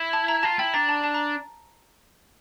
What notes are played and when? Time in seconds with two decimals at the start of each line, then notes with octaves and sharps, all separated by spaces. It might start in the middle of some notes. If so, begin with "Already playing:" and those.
Already playing: E4
0.13 A5
0.28 A#5
0.43 F4 A5
0.58 E4 G5
0.73 D4 A#5
0.89 A5
1.04 A5
1.15 A#5